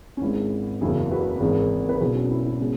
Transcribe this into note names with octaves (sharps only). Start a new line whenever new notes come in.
C#4
G#1 G#2 G#3 E4
F#1 E2 C#3 F#3 E4 G#4
F#4 B4
G#1 G#2 E3 G#3
B4
B1 B2 F#3 E4 G#4
C#4 F#4
E4
E4
B2 G#3 C#4